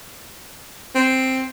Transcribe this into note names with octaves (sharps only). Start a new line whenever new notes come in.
C4